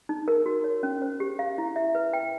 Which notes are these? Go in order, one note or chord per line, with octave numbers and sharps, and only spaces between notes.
D#4
A#4
F#4
C#5
C#4
C5
G4
F5
E4
E5
B4
G5